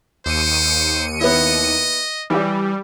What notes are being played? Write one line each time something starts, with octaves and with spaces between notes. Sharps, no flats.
D#2 C5 C#7 D#7
B3 E4 D#5
E3 G3 G4